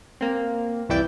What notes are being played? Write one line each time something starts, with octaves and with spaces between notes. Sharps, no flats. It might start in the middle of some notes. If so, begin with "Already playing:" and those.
A#3 C4
C2 F2 E3 E4 D5 G5